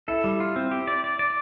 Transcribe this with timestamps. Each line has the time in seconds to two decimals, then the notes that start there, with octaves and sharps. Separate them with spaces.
0.08 E4 A4
0.24 G3
0.40 F4
0.56 C4
0.71 G4
0.87 D5
1.04 D5
1.19 D5